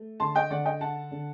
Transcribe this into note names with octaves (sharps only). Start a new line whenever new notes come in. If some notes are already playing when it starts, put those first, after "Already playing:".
Already playing: A3
D3 A5 C6
D#5 G5
D3 D5 F#5
D#5 G5
D4 F#5 A5
D3